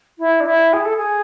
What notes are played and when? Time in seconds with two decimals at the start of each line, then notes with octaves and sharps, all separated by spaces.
0.18 E4
0.40 D4
0.45 E4
0.73 G#4
0.85 A4
0.96 G#4